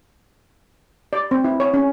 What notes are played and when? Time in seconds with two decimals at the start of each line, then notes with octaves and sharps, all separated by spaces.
1.13 D5
1.31 C4
1.44 E4
1.60 C#5
1.74 C#4